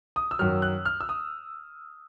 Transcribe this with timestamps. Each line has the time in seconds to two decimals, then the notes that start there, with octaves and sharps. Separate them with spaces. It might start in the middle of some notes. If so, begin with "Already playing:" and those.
0.16 D#6
0.31 E6
0.39 F#2 D#3 F#3 F6
0.62 F#6
0.85 F6
1.01 E6
1.09 D#6